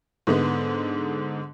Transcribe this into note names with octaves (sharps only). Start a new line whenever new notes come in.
G#2 D3 G#3 B3